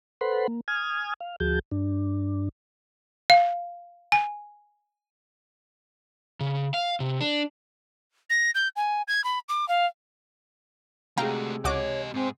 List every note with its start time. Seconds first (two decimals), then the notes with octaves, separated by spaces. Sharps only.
0.21 A4 B4 C5 F#5 B5 C6
0.48 A#3
0.68 G#5 D#6 F6 G#6
1.20 F5
1.40 D2 F3 F#4 G#4 A5 G6
1.71 G2 D4
3.30 F5
4.12 G#5
6.40 C#3
6.74 F5
7.00 C3
7.21 D4
8.30 A#6
8.55 G6
8.76 G#5
9.08 G#6
9.24 B5
9.49 D6
9.68 F5
11.17 C3 G#3 A3 F#4 F5 G5 A#5
11.64 C#2 F#4 G4 C#5 D#5 D6
12.14 G#2 C4 G#4